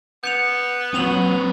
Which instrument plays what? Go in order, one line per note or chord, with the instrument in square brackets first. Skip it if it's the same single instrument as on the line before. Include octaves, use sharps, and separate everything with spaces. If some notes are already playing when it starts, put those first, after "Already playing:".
[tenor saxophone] B3 [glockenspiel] G6 C#7 F7
[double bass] F#3 [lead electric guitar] C4 B4 [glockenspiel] D#7 F7 F#7